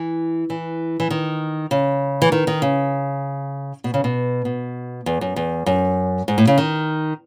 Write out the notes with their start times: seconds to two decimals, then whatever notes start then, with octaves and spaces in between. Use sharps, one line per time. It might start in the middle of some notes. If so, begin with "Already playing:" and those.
Already playing: E3
0.50 E3
1.00 E3
1.10 D#3
1.71 C#3
2.22 E3
2.32 D#3
2.47 D#3
2.62 C#3
3.84 B2
3.94 C#3
4.04 B2
4.45 B2
5.06 E2
5.21 F#2
5.36 E2
5.66 F#2
6.28 G#2
6.38 A2
6.47 C#3
6.58 D#3